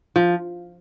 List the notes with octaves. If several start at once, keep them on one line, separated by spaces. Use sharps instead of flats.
F3